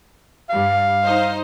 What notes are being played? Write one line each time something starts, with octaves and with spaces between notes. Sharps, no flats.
G2 G3 F5
D#4 C5 D#5